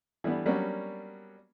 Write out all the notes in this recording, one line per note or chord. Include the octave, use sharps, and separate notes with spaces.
E3 G3 A3 B3 D4
F#3 G3 A#3 B3 C#4 D4